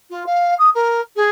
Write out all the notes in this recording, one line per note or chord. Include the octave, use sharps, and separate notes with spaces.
F4
F5
D#6
A#4
G#4